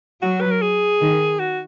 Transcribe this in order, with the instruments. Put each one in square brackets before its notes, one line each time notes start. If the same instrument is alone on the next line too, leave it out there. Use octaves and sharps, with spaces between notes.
[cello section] F#3 [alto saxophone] F#4
[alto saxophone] B4
A#4
G#4
[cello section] D#3
[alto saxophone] F#4